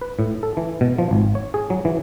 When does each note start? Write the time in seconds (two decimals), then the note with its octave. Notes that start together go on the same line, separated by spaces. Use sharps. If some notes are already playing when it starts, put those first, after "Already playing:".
0.01 B4
0.19 A2
0.43 A4
0.57 E3
0.81 B2
0.98 F3
1.11 G#1
1.35 C#5
1.54 G#4
1.70 F#3
1.85 E3